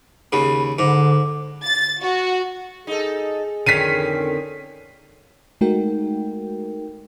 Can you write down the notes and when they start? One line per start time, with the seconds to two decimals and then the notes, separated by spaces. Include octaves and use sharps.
0.33 D#2 C#3 B5
0.79 G#2 D3 D6
1.65 A6
2.02 F#4
2.87 D#4 G#4 A4
3.66 F2 D3 D#3 C#4 B6 C7 D#7
5.61 G#3 A3 D#4 F#4 A#4 G5